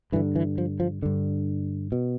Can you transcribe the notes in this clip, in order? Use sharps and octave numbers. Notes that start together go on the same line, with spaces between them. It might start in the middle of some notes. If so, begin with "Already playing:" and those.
G2 D3 E3
E3
F3
F3
G2 D3
B2